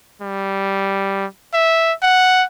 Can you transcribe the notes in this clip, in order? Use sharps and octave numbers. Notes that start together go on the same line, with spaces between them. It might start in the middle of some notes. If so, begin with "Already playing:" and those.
G3
E5
F#5